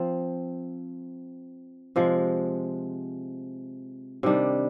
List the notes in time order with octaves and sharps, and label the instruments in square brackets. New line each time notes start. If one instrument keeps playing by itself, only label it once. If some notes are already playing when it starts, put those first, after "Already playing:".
Already playing: [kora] F3 C4
C3 F3 G#3
C3 D#3 G3 D4